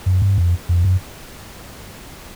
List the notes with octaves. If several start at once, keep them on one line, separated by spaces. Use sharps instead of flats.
F#2
G2
F2
F2
F#2